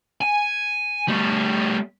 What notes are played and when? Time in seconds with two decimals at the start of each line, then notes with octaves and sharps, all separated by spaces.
0.21 G#5
1.08 G3 A3